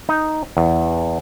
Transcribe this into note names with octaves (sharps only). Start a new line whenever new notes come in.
D#4
E2